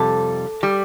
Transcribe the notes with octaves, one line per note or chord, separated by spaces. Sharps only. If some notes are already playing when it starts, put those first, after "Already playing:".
Already playing: F2 C3 G3 A4
G3